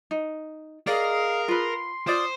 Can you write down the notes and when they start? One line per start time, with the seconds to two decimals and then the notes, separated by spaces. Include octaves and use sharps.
0.11 D#4
0.87 G#4 A#4 D5 D#5 F5
1.48 F4 B4 C6
2.07 F4 C5 D5 D#6